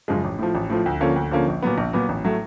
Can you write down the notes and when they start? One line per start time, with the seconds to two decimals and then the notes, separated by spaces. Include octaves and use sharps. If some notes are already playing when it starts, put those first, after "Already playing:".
0.08 F#2 C#3 F3 G#3
0.24 A1
0.39 A2 F3
0.55 A1
0.70 A2 F3
0.86 D2
1.00 D3 F3 A#3 C#4
1.16 D2
1.31 D3 F3 A#3 C#4
1.48 A#1
1.62 A#2 F#3 B3
1.78 A#1
1.93 A#2 F#3 B3
2.09 A1
2.24 A2 F#3 A3